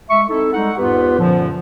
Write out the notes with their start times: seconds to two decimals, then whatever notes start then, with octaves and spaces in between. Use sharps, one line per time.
0.09 G#3 E5 C#6
0.28 C4 D#4 E4 A4
0.53 G3 G#3 D#4 A4 F#5
0.77 E2 G#2 B3 F4 G4 B4
1.18 F#2 A#2 D3 F3